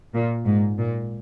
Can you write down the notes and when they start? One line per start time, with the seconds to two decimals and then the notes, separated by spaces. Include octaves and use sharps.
0.14 A#2
0.46 G#2
0.78 A#2